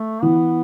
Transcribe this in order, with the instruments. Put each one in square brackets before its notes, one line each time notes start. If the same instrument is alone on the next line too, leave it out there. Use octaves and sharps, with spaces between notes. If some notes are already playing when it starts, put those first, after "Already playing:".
Already playing: [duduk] A3
[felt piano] E3 [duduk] B3